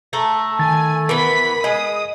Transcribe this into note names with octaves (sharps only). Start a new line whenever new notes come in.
A3 A4 A#5
D#3 G#5 A6
E3 B3 A#4 B5 B6
G#3 D#5 D#6